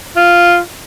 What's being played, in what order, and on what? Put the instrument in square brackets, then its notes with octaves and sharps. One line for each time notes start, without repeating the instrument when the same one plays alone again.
[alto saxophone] F4